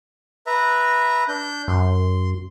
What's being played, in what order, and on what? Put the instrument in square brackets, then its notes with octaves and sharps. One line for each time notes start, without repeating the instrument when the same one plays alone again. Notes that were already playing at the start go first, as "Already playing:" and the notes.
[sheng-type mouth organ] B4 E5 A#5
D4 G6
[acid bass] F#2 [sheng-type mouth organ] C6